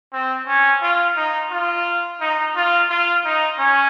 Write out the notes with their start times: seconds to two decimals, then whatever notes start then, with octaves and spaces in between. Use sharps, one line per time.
0.13 C4
0.47 C#4
0.82 F4
1.17 D#4
1.51 F4
2.21 D#4
2.56 F4
2.90 F4
3.24 D#4
3.59 C#4